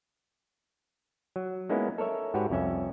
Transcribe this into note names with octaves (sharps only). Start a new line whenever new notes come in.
F#3
G#3 A#3 B3 C#4 D#4 E4
A4 A#4 C#5 E5
G#2 F#4 G4 B4 C#5
C2 F2 C#4 E5